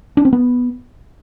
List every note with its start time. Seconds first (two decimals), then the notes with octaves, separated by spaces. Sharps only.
0.17 D4
0.25 C4
0.33 B3